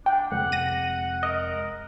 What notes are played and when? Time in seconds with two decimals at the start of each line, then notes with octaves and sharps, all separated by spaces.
0.06 D4 G5
0.32 F2 C3 G#3 F#5
0.52 A#6 D#7
1.23 A#4 D#5